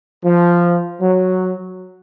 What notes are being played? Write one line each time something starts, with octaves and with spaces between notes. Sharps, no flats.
F3
F#3